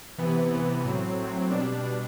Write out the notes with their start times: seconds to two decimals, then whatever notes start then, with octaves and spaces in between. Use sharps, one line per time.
0.18 C3 E3 B3
0.52 C3 E3 B3
0.84 A2 F#3 C4
1.18 A2 F#3 C4
1.50 B2 G3 D4
1.83 B2 G3 D4